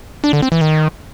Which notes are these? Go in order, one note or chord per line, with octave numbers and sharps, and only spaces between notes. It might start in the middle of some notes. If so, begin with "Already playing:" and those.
D4
D3
C4
E3
D#3